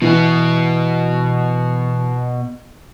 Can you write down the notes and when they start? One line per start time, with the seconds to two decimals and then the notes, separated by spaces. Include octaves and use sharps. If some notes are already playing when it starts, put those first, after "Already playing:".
0.02 B2 E3 B3